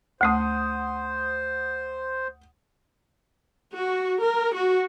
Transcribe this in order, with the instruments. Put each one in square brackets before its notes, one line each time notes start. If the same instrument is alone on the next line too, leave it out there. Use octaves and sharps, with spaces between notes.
[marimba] D2 A3 [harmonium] C5 [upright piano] F#5 D#6
[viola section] F#4
A#4
F#4